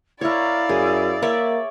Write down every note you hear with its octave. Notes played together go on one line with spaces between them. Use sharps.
E4 A#4 C#5 D5 F5
F#2 G#4
A#3 C#5 D5 E5